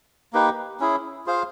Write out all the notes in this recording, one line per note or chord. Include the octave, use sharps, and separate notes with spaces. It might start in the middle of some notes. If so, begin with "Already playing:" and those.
A#3 D#4 G4 B4
C#4 E4 G#4
F4 G#4 C5 F5